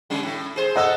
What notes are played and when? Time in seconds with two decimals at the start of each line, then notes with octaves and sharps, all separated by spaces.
0.10 D3 G3 C#4
0.23 A2
0.56 G#4 C5
0.76 A3 A4 D#5 F#5 E6